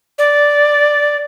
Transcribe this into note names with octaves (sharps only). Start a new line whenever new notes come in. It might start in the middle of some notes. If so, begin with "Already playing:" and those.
D5